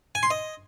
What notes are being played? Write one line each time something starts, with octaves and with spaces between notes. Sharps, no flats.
G#5
C6
D#5